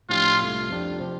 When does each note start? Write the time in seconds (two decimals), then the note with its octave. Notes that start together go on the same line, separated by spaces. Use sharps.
0.09 A2 F3 D4 F4 G4
0.39 C2 C3 A3 F4
0.69 F2 F3 D4 G4
0.99 C3 F3 C4